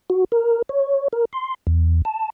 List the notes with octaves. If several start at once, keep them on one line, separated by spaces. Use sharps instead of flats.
F#4
A#4
C#5
A#4
C6
E2
A5